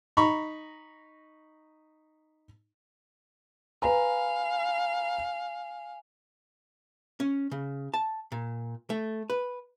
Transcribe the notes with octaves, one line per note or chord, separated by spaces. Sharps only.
D#4 A#5 B5 C#6
B4 F5 G#5 A#5
C#4
C#3
A5
A#2
A3
B4